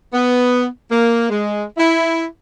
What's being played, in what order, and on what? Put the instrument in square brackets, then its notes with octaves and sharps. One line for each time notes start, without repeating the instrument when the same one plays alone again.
[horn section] B3
A#3
G#3
E4